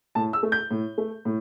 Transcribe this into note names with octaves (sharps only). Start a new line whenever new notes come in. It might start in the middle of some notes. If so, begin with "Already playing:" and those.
A2 A5
E6
A3
G6
A2
A3
A2